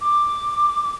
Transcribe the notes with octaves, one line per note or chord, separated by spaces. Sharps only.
D6